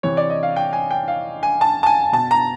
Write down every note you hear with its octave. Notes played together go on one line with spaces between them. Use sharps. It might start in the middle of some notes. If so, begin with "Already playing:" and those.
C3 E3 C#5
D5
D#5
F5
G5
G#5
G5
F5
G#5
A5
A5
G#5
B2 A5
A#5